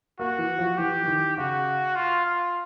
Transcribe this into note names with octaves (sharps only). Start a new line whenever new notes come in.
A#3 F#4
E3
F3
E3 G4
E3
D#3
C#3 F#4
F4
F4